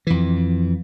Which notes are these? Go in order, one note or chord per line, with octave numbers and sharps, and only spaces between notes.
F2 E3